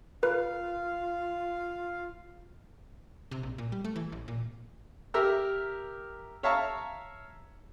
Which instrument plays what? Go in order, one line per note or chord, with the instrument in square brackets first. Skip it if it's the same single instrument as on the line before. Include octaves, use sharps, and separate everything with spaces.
[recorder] F4 [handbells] A#4 B4 [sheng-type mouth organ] F5
[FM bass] C3
A#1
A#2
G3
A3
E3
A1
A#2
[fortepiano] G4 A#4 E5 A#5 E6
C#5 E5 F5 A5 A#5 C#6